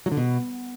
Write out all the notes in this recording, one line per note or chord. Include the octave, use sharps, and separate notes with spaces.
F#3
D3
B2